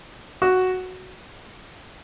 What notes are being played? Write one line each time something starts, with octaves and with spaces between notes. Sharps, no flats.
F#4